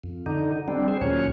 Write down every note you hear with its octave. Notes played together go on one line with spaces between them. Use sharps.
F2
D3 D#4
G3 C4 D4
G#4 C5
D#2 A#2 F#3 C#4 C#5